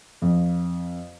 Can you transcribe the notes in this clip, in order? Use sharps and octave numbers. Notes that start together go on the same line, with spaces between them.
F2